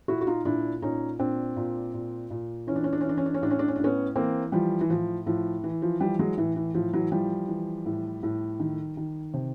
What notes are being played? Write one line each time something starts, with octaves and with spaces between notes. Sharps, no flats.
A#2 E4 F#4
F#4
D#4 F4
A#2 D4 E4
A#2 C#4 D#4
A#2 C4 D4
A#2
A#2
A#2
E3 C#4
D4
C#4
D4
C#4
E3 D4
C#4
D4
C#4
A2 D4
C#4
D4
C#4
A2 D4
B3 C#4
E3 A#3 C4
E3 F3 G3
E3
A2 F3
A2 F3
E3
F3
E3 F3 G3
F#3 G#3
A2 E3
E3
A2 F3
E3 F#3
E3 F3 G3
E3
A2
A2
D#3
D#3
C3